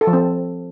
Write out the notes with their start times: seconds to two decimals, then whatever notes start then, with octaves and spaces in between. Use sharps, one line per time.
0.01 A4
0.07 F3
0.13 C4